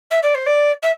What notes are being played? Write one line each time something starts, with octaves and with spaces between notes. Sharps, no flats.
E5
D5
C5
D5
E5